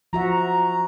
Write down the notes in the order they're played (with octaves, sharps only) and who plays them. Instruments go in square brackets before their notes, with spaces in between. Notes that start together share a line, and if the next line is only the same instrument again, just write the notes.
[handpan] F3 F#4 E5 [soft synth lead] A#5